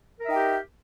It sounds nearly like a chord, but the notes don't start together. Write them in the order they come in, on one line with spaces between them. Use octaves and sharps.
A#4 E5 D#4 G5 G4